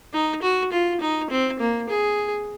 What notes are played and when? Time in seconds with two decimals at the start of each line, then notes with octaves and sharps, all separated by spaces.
0.13 D#4
0.42 F#4
0.73 F4
1.01 D#4
1.30 C4
1.60 A#3
1.89 G#4